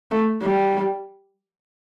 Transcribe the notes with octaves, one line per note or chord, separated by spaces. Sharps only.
A3
G3